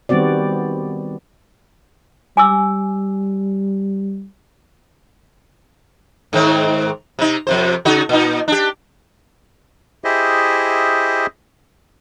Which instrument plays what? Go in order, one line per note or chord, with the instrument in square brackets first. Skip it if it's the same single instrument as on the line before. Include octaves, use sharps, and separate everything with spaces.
[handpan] D#3 G3 B3 C4 F#4 D5
[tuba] G3 [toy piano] G#5 D6 E6
[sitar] G#2 D#3 C4
C3 D#4
F2 C3 C5
C#3 D#4 F#4
A#2 D#4
D4 G4
[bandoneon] E4 G4 G#4 C5 D#5 E5